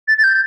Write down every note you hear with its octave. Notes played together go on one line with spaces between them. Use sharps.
A6
A6
G6